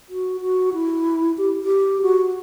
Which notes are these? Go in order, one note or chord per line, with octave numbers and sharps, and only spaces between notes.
F#4
F#4
E4
G4
G4
F#4